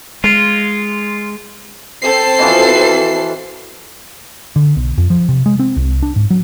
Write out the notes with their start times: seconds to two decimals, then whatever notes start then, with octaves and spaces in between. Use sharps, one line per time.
0.24 G#3 F4
2.02 C4 A4 C7
2.39 B2 E3 F3
4.56 D3
4.76 B1
4.98 F2
5.10 F3
5.29 C3
5.46 G#3
5.59 C4
5.77 C2
6.03 D4
6.16 G#2
6.30 F#3